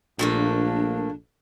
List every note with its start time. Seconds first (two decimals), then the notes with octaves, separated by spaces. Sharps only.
0.19 A#1 A#2 A3 A#3 D4